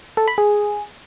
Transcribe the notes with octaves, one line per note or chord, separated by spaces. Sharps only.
A4
B5
G#4